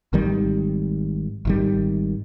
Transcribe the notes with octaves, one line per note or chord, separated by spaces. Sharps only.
G#1 D#3 G3
G#1 D#3 G3